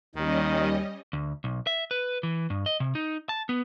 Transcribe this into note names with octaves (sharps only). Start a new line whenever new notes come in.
D#2 D#3 G3 C#4 D#5
D2
B1
E5
B4
E3
G2
D#5
C3
D#4
A5
B3